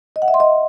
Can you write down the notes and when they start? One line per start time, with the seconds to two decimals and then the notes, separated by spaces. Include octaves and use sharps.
0.16 D#5
0.22 F#5
0.28 E5
0.34 C6
0.40 D#5